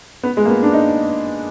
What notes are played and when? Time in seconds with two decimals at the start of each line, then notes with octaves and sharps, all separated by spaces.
0.23 B3
0.37 G#3
0.45 A#3
0.50 B3
0.63 D4
0.73 D#4